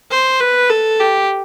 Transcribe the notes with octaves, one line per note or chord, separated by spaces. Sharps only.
C5
B4
A4
G4